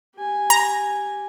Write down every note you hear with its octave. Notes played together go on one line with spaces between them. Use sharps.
G4 G#5
A#5